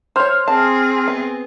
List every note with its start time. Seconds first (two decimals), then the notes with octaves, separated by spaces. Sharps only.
0.16 C5 C#5 C6 F6
0.48 C4 G#4 A5
1.08 B3